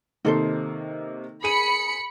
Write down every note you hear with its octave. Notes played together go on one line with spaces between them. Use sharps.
C3 D#3 A#3 D#4 A4 C5
G#4 B5 C#7 D#7